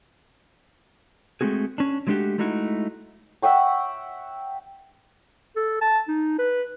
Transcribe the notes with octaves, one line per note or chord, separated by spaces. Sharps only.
G#3 A3 C4 F#4 G#4
C#4 D4
F#3 G#3 A3 D4 F#4 G4
G#3 A3 D#4 E4 F#4
E5 F#5 G5 C#6
A4
A5
D#4
B4